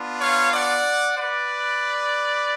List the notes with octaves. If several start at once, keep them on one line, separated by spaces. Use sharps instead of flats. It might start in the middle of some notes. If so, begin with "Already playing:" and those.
Already playing: B3 D4 F4
C#5 F5
D5 F#5
B4 D5